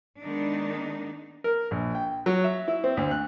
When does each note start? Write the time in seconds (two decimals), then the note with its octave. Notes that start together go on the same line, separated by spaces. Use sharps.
0.20 D#3 G#3 B3 D4 D#4
1.44 A#4
1.71 A#1
1.95 G5
2.26 F#3
2.44 E5
2.68 E4
2.84 C4
2.97 D2
3.11 F#6